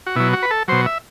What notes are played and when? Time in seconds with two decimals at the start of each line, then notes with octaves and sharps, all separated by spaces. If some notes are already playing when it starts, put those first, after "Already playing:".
0.06 F#4
0.16 B2 F#3 E4
0.33 F#4
0.43 B4
0.51 A4
0.68 B2 F#3 C5
0.86 E5